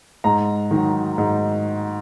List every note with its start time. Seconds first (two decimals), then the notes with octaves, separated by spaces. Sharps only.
0.24 G#2 A#5
0.71 D#3 F#3
1.18 G#2